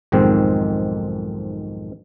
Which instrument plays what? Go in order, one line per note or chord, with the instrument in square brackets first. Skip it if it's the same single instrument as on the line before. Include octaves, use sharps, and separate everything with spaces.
[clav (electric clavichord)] B1 F2 G#2 D#3 G#3 C4